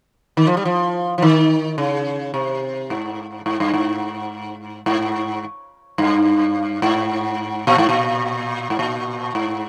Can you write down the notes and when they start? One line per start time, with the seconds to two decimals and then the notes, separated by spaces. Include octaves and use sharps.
0.37 D#3
0.47 F3
0.57 G3
0.65 F3
1.18 F3
1.22 D#3
1.78 C#3
2.34 C3
2.90 G#2
3.46 G#2
3.60 G2
3.74 G#2
4.86 G#2
5.98 G2
6.82 G#2
7.67 A#2
7.78 G#2
7.89 A#2
8.70 G#2
8.79 A#2
9.35 G#2